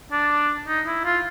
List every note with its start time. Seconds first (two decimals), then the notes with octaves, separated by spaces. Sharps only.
0.12 D4
0.68 D#4
0.87 E4
1.05 F4